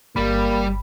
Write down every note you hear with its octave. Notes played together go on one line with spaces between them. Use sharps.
G1 G3 A#3 B5